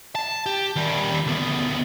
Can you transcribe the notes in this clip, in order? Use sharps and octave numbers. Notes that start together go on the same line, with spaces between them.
A5
G4
D#3 G3
D2 B3